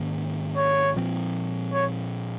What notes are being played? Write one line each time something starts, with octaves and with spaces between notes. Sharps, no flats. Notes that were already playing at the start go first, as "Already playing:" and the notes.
Already playing: G#2 D#3 A#3 C#4
C#5
A#2 F3 C4
C#5